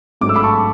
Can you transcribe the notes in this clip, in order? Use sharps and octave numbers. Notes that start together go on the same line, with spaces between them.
G#2 F#3 A3 D4 D6
E6
B5 D6
A5 C#6